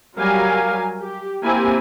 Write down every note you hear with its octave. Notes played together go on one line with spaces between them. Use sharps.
F#3 G3 A#4 F5 G#5
G4
A#3 C4 E4 G4 G#5